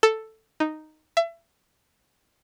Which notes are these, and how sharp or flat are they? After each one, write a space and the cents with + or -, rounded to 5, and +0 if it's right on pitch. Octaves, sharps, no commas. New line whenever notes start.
A4 +5
D#4 -5
E5 +30